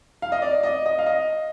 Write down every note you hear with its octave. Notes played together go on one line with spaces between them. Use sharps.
F5
D#5
D5
D#5
D#5
F5
D#5